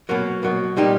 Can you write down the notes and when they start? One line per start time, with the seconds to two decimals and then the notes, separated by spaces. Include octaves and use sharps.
0.09 B2 F#3 A#3
0.43 B2 F#3 A#3
0.77 A#2 G3 A#3 D#4 G4